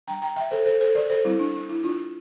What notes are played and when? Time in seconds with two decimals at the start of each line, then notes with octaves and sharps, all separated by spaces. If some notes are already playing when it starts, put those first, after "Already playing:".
0.07 G3 D4 G5 A#5
0.22 G5 A#5
0.36 E5 G5
0.51 A4 C5
0.66 A4 C5
0.81 A4 C5
0.95 A#4 D5
1.10 A4 C5
1.25 G3 C4 E4
1.39 D4
1.54 D4
1.69 E4
1.83 D4 F4